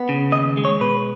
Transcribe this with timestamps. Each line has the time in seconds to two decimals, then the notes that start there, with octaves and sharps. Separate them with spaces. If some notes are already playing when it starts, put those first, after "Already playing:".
Already playing: B3
0.09 C#3
0.32 D#2 D#5
0.57 G#3
0.65 C#5
0.80 B2 B4